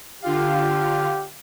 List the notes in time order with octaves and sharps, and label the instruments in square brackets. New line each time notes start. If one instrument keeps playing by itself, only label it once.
[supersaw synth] D3 F4 F5 [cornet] G4